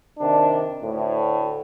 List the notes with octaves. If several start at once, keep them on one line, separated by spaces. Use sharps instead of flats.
C3 D#3 D4
D2 A2